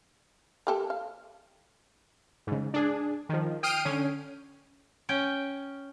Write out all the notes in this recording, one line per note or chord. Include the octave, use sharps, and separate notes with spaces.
A#3 G4 A4
F5
G#2 C#3
D4 G#4
D#3 F3
G5 D#6 F6 C7 D7 D#7
D3 C#4
C#4 G5